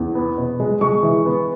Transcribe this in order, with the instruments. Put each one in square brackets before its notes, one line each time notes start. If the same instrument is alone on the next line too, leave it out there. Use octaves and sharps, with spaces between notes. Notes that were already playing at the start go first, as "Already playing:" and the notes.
Already playing: [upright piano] E2
B3
B2
G#3
G#3 C#6
E3
B3